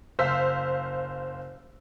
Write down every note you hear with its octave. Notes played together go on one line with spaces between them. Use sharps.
F#1 C5 F5 E6 B6